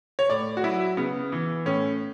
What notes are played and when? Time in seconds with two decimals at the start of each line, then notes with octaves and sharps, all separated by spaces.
0.19 C#5
0.30 A2 D5
0.57 F#4
0.63 F#3 E4
0.97 C#3 B3
1.32 E3
1.66 A2 C#4